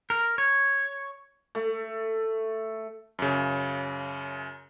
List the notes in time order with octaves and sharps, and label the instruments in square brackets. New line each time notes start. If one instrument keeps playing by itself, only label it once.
[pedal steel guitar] A#4
C#5
[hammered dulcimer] A3
[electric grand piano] F#2 C#3